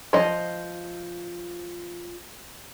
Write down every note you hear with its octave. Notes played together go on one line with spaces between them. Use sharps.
F3 D#5